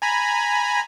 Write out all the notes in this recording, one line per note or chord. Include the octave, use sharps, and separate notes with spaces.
G#5 A#5 B5